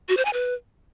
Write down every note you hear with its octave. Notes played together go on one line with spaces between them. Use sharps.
F#4
C5
G#5
B4